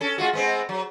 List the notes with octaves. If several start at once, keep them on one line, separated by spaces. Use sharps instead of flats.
C#4 A4
G#3 F4 F#4
G#3 B3 C4
F#3